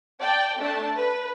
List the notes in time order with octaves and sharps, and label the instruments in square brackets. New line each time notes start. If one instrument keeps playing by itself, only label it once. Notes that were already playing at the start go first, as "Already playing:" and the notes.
[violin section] D5 G5 A5
A3 D4 A5
B4